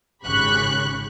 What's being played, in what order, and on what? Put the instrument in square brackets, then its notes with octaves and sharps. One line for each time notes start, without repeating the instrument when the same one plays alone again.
[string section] G#1 C#3 G4 B5 C#6 F#6